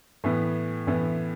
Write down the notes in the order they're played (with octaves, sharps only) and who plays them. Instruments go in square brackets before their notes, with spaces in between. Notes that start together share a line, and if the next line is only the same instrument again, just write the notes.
[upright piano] A2 E3 B3
A2 E3 B3